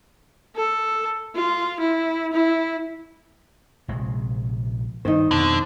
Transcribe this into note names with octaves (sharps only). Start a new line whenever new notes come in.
A4
F4
E4
E4
A#1 C3 G#3
G2 D#3 D#4 C5
F2 B2 D3 D#3